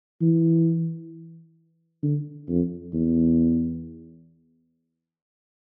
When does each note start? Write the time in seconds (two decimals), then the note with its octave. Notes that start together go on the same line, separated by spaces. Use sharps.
0.21 E3
2.03 D3
2.49 F2
2.93 E2